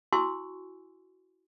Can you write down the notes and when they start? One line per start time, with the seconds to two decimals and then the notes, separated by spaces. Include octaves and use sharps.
0.13 E4 F#4 G#5 C6 C#6 E6